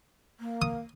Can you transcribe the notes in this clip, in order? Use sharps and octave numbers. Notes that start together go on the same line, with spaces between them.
A#3
D#6